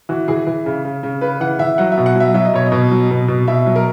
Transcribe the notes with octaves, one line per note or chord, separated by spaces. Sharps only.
E3 F#4
E3 G#4
E3
C#3
C#3
C#3
C#3 B4
E3 F#5
E3 E5
F#3 F#5
E5
B2
F#5
F#3 E5
F#3 E5
D#5
B2 C#5
D#5
B2
F#3
B2
B2
B2 E5
F#3
A#4